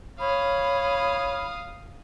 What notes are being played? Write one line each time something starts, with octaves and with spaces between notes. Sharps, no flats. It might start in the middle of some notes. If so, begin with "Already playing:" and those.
C#5 F5 B5 D#6